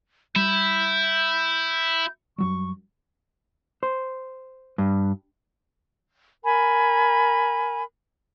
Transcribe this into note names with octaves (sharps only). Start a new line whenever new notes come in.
G3 E4 G6
F#2 F#3 G3 C#6
C5
G2
A#4 G#5 B5